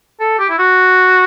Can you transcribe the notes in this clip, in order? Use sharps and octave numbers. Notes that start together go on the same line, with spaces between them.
A4
G4
E4
F#4